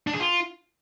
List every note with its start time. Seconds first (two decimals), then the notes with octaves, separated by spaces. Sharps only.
0.07 D4
0.14 G#4
0.20 F4